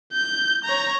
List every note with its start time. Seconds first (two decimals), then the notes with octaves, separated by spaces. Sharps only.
0.13 G6
0.65 C#5 A#5